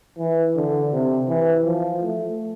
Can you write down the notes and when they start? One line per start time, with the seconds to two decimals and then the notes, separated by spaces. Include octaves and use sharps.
0.18 E3
0.56 D3
0.92 C3
1.28 E3
1.65 F3
2.01 A3